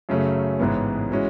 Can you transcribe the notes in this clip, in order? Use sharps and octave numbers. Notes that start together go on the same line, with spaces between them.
F#2 C#3 F#3 A3 C#4
A1 G#2 E3 G#3 B3
E3 G#3 C#4 F#4